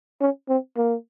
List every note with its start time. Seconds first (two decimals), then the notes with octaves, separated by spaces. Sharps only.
0.21 C#4
0.49 C4
0.77 A#3